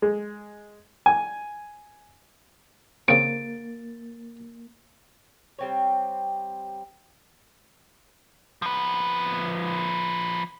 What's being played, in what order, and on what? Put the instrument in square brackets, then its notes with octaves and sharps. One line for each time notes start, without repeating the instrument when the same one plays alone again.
[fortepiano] G#3
G#5
[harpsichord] C#3 C4 [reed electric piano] A#3 A6 [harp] D7
[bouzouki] G3 C4 C#5
[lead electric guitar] F3 B4